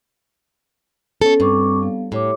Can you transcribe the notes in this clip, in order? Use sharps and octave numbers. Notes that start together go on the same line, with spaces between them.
B3 C#4 A4 C#5
G2 C4 C#6 D6
B3 F5
A2 G4 C#5 D6